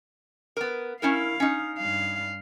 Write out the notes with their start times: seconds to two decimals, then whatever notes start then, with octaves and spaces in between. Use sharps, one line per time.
0.57 B3 A#4
1.02 C#4 E4 A#4 F5
1.40 C#4 D#4
1.79 G2 F5